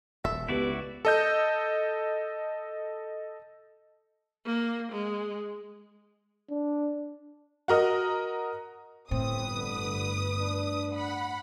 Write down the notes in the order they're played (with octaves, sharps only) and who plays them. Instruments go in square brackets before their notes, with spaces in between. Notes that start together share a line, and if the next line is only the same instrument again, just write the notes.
[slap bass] D#1 [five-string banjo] A4 E5
[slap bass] C#2 [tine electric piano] B3 G4 B4 [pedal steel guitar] E4 F#4 D5
[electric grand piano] A4 D#5 G6
[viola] A#3
G#3
[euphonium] D4
[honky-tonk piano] F#4 A#4 D#5
[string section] G1 B4 D#6 [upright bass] A2 [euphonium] C4
[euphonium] D3
D4
[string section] F#5 B5